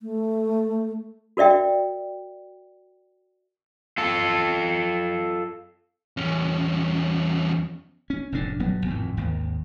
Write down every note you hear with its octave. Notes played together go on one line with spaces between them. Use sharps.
A3
F#4 A#4 D5 E5 G5
F4 A4
E2 C#4
C#4
F1 F2 A2 D4
D#1 G2 F#3 B3
G#1 F2 A2
G#1 D#2